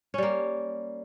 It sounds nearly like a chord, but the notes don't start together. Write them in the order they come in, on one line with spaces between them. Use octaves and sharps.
C#4 G3 A#3